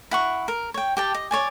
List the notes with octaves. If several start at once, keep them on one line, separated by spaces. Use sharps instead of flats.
E4 F#5 C#6
A#4
C#5 G5
G4 G5 A5
D#5
C#5 D5 G#5